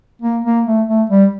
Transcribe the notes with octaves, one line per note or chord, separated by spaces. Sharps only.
A#3
A#3
A3
A3
G3